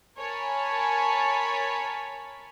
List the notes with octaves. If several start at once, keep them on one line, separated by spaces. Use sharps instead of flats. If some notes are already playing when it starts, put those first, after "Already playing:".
A#4 C#5 G#5 A5 B5